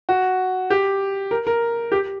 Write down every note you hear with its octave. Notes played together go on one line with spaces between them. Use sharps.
F#4
G4
A#4
A#4
G4